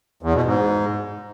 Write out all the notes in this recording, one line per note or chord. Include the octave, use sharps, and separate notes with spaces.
E2
B2
G#2